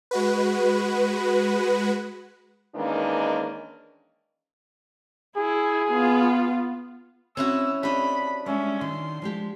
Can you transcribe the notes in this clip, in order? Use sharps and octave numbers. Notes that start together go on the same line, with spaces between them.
G#3 F#4 B4
D#3 E3 G#3 A#3 C#4 D4
E4 G#4
B3 F4
C4 C#4 E4 F#4 E6
C4 D4 G4 C#5 D#5 B5
G3 G#3 C#4 E5
D#3 C6
F3 G#3 G4